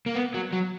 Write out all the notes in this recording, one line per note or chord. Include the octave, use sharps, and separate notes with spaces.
A#3
B3
F#3
F#3